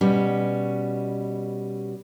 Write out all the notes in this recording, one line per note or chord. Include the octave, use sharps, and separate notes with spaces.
B2 G3 C#4